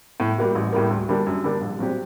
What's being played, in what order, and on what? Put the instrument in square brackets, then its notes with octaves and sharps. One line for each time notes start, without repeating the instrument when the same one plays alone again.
[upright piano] A2
G3 A#3 F#4
A1
A2 G3 A#3
D2
D3 G3 A#3 D4
F#2
D3 G3 A#3 D4
A#1
A#2 F#3 C4 G4